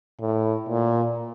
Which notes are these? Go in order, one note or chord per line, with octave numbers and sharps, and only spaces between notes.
A2
A#2